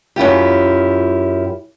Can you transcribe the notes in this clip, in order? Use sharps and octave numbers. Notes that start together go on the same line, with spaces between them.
F#2 E4 F4 G4